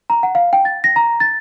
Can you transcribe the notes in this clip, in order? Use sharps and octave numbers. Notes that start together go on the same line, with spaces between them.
A#5
F#5
F5
G5
A6
A#6
A#5
A6